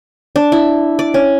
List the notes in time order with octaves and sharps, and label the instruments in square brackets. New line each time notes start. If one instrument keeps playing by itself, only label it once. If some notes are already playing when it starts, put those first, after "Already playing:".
[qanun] D4
E4
D5
C#4